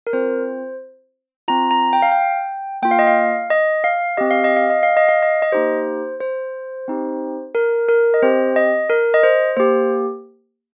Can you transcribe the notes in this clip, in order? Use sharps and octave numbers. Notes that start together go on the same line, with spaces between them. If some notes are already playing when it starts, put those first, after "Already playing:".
A#4
C4 F4 C5
C4 F4 A#5
A#5
G5
F5
G5
A#3 F4 G5
F5
D#5
F5
D#5
F5
C4 G4 D#5
F5
D#5
F5
D#5
F5
D#5
F5
D#5
D#5
A#3 D#4 G4 C5
C5
C4 D#4 G4
A#4
A#4
D#5
C4 G4 C5
D#5
A#4
D#5
C5
A#3 G4 C5